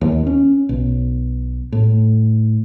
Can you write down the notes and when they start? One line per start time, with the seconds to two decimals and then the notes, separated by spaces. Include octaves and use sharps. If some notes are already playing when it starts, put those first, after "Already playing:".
0.01 D#2
0.27 C#4
0.69 B1
1.72 A2